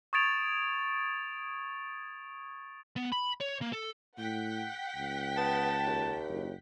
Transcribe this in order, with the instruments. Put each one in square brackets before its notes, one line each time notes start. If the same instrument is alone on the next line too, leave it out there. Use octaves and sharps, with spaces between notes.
[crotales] C#6 D#6 G#6 A6 D7 F7
[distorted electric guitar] B3
B5
C#5
A#3
A4
[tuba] A2 [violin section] F#5 G5 B6
[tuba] C#2
[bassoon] B3 [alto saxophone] A5
[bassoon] D#2
[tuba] F#1